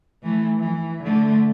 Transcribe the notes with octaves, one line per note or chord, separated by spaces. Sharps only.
E3 A3
E3
D3 A3